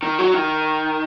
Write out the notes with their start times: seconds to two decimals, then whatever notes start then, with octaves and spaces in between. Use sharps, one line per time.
0.03 D#3
0.19 F#3
0.34 D#3